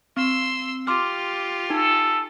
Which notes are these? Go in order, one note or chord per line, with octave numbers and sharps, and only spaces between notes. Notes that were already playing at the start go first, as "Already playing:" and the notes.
C4 C6 E6
F4 G4 C6 D6 F6
D#4 A4